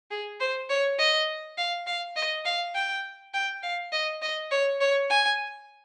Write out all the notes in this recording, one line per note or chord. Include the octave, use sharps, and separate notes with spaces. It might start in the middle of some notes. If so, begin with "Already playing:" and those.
G#4
C5
C#5
D#5
F5
F5
D#5
F5
G5
G5
F5
D#5
D#5
C#5
C#5
G#5